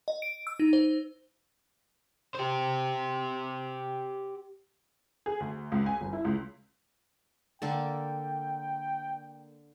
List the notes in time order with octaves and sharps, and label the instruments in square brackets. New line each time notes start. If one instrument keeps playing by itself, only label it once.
[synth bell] D#5
D7
E6
D#4
C5
[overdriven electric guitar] G4 C5
[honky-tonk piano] G#4
D2
C#2
G#5
G1
E4
C#2
[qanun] D3 A#3 A4 [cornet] G5